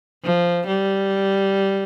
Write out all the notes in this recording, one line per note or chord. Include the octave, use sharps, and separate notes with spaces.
F3
G3